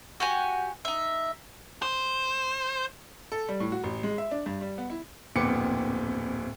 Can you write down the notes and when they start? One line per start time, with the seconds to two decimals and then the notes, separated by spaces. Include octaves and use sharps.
0.20 F#4 G4 F#5 G#5
0.85 D#4 E5
1.82 C5
3.32 A4
3.49 G3
3.60 A2
3.72 F#4
3.84 A1
4.03 G#3
4.18 E5
4.31 D4
4.46 G2
4.61 G3
4.78 B3
4.90 E4
5.36 D1 F2 A#2 B3 D6 C#7